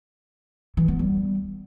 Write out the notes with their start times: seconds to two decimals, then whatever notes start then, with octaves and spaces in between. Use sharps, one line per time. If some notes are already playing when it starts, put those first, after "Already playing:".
0.77 E3
0.88 B3
0.99 G3